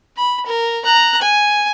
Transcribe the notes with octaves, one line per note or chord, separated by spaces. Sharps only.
B5
A#4
A#5 F#6
G#5